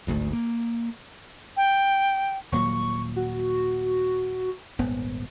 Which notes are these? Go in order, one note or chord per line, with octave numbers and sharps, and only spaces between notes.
D1 G#1 D2 A3
A#3
G5
D#1 A#2 F#3 C#6
F#4
D#1 G#1 B3